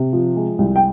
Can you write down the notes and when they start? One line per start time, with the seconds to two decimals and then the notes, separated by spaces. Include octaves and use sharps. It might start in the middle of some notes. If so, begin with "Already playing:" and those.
Already playing: C3
0.13 F3
0.36 G#3
0.59 C2
0.76 G5